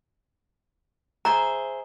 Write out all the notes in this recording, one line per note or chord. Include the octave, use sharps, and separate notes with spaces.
G#4 C5 E5 A#5